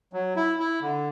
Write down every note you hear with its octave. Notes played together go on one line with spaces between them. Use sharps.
F#3
E4
E4
D3